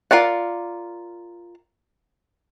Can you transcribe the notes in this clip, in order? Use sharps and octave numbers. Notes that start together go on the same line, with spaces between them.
F4 A#4 D5 F#5